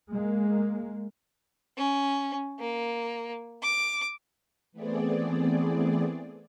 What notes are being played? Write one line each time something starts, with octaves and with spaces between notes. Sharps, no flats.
G#3 A#3
C#4
A#3
D6
E3 A3 B3 C4 G#4 D5